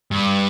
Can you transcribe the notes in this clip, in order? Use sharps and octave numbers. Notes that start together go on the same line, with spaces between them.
G2